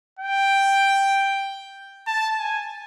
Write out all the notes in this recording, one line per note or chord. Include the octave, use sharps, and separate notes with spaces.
G5
A5
G#5